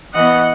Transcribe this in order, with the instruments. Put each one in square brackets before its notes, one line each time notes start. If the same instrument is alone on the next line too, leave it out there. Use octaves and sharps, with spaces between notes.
[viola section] E3 B3 D#5 F#5